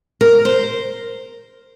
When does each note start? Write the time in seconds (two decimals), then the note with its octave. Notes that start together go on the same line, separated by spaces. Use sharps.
0.21 A#4
0.45 C5